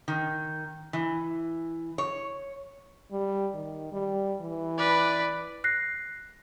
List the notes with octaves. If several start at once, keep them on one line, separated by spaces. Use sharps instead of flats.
D#3
E3
C#5
G3
D#3
G3
E3
B4 D5
F#6 A#6 C7